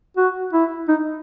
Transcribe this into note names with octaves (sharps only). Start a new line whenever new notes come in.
F#4
E4
D#4